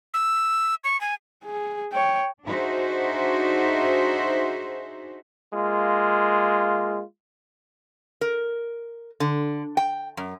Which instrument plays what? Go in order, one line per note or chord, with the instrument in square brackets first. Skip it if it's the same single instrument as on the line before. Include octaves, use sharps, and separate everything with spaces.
[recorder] E6
C#6
G#5
[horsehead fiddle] G#4
C#5 G5
[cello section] D4 D#4 F#4 G#4 C5 E5
[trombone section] G#3 A#3 F4
[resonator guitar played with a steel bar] A#4
D3
G5
F#2